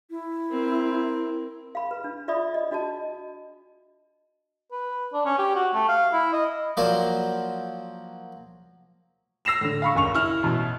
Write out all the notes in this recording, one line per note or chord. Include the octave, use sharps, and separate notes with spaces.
E4
C4 A#4
F5 B5
B4
D4
F4 D5 E5 B5 D#6
D#5
D4 F#4 D#5 A5
B4
D4
C#4
G4
F#4
A3
F5
E4
D#5
F3 F#3 A#3 C5 D5 F5
E6 A#6 C7 E7 F7
A2 D3
F5 B5 C#6
G#1 C#2 C#6 F7
E4 E6 F6
A1 B2